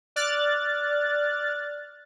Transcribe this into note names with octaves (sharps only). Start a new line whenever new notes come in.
D5 F6 F#6 A6